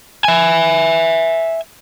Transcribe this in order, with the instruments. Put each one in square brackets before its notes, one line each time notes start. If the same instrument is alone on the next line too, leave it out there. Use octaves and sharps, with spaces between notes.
[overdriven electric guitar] E5 G#5